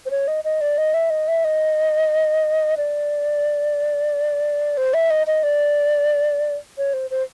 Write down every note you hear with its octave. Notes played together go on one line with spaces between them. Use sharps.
C5
C#5
D#5
D#5
D5
D#5
E5
D#5
E5
D#5
D5
C5
E5
D#5
D#5
D5
C#5
C5
C5